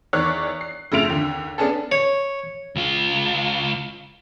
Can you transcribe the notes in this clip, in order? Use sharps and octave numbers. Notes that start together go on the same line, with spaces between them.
E2 D#3 C#5 D5 C#6 F#6
C7
F2 C#3 A3 F4 D7 F7
D#2 D3
B3 C#4 D4 G#4 A4
C#5
C#2 F4